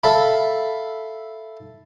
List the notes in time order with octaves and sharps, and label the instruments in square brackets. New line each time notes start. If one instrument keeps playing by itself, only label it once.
[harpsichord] A4 E5 F5 B5